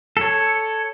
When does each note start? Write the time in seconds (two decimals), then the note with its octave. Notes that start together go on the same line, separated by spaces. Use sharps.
0.17 A4 C#5